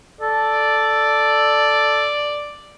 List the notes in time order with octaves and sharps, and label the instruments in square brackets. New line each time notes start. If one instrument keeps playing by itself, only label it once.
[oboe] A4 [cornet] D5